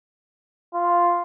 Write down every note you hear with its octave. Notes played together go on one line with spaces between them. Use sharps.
F4